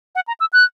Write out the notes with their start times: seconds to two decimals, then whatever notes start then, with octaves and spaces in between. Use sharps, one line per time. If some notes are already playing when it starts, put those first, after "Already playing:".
0.15 F#5
0.27 A#5
0.40 E6
0.53 F#6